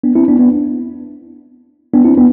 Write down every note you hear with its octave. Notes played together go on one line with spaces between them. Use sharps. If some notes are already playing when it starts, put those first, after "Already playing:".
B3 D4
C4 E4
B3 D4
B3 D4
B3 D4
C4 E4
B3 D4